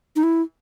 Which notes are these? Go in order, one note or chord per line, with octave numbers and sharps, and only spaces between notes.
D#4
E4